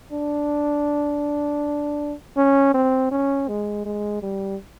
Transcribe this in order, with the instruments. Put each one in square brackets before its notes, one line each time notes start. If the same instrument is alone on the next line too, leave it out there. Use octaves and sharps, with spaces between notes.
[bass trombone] D4
C#4
C4
C#4
G#3
G#3
G3